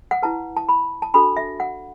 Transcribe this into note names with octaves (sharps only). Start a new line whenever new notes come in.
F#5
E4 B4 A5
A5
B5
A5
D4 F#4 A4 B5
E5
F#5